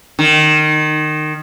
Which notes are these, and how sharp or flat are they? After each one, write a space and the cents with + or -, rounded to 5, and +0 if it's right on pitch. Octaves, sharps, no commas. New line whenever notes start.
D#3 -20